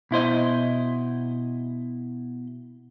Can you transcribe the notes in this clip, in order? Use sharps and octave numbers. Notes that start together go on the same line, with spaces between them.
B2 E4 C5 D#5